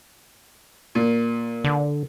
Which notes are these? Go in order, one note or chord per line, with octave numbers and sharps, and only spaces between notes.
A#2
D3